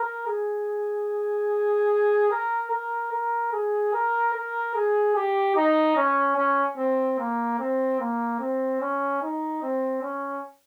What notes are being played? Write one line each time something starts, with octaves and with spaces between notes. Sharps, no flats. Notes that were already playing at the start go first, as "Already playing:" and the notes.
Already playing: A#4
G#4
A#4
A#4
A#4
G#4
A#4
A#4
G#4
G4
D#4
C#4
C#4
C4
A#3
C4
A#3
C4
C#4
D#4
C4
C#4